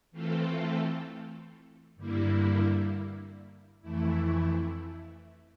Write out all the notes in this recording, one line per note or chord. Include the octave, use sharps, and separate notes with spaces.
E3 A3 C4 F4 A4
G2 D3 G3 A#3 E4
F2 E3 A3 E4